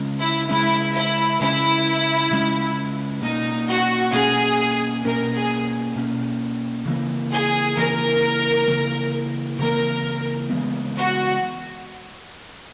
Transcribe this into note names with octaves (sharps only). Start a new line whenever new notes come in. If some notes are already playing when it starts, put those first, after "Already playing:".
Already playing: C#3 G#3 C#4
E4
C#3 G#3 C#4 E4
E4
C#3 G#3 C#4 E4
C#3 G#3 C#4
B2 A#3 C#4 D#4
F#4
B2 A#3 C#4 G#4
B2 A#3 C#4 A#4
G#4
B2 A#3 C#4
C#3 E3 A#3
G#4
C#3 E3 A#3 A#4
C#3 E3 A#3
C#3 E3 A#3 A#4
C#3 E3 G#3 B3
F#4